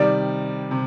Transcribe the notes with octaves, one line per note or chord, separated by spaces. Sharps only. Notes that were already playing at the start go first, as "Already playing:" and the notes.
Already playing: C3 D#3 G3 D5
C3